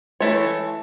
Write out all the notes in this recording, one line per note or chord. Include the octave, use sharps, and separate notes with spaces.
E3 A3 C#5